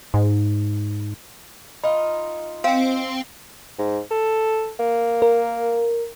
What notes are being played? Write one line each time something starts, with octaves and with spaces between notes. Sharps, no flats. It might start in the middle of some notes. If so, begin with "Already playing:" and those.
G#2
D#4 F4 B5
C4 F5 G5
G#2
A4
A#3
A#4